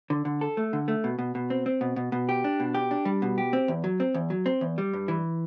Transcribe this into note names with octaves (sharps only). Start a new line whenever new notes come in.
D3
D3
A4
A3
D3
A3
B2
B2
B2
C4
C4
B2
B2
B2
G4
D4
B2
G4
D4
G3
B2
G4
C4
E2
F#3
C4
E2
F#3
C4
E2
G3
G2
E3